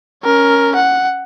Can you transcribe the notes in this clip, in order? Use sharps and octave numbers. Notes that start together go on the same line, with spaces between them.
C#4 A#4
F#5